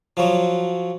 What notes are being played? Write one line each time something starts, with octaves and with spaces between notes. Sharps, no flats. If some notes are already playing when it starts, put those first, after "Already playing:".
F3 F#3